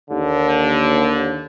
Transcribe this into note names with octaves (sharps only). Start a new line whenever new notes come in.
D#2 D3